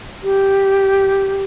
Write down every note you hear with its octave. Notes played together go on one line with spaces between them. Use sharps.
G4